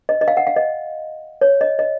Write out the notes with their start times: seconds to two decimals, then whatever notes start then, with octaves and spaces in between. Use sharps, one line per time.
0.09 D#5
0.21 D#5
0.28 F5
0.37 F#5
0.47 F5
0.56 D#5
1.41 C#5
1.61 D#5
1.79 D#5